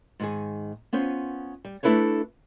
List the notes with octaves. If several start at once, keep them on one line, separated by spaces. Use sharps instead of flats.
G#2 D#3 G#4
B3 C#4 F4 C5
G3
A3 D4 E4 A4 B4 C#5